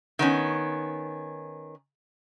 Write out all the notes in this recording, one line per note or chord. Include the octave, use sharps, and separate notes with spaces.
D#3 B3 C#4